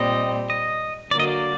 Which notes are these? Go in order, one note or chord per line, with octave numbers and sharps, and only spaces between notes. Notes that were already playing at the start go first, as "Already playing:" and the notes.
Already playing: A#2 G3 C4 D#5
D#5
D3 F#3 A#3 D5
D#5
D5